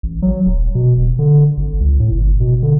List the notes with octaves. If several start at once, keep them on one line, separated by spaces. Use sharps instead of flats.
A1
F#3
D#1
B2
D#1
D3
G#1
C#2
A2
G1
B2
D3